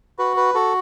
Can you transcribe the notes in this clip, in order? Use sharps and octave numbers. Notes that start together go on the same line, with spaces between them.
F#4 B4
B4
F#4 A4